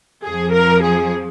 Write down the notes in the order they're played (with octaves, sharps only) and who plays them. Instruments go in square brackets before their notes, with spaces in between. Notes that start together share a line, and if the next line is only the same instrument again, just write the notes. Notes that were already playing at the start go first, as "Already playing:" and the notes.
[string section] F2 F3 G#4
A#4
G#4